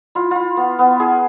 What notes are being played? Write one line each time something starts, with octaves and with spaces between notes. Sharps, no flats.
E4 F4
E4 F4
B3
B3
E4 G#4